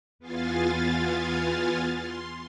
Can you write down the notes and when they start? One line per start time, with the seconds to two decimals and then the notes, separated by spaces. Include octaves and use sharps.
0.19 E2 B3 F4 F5 G#5 A6
1.90 C6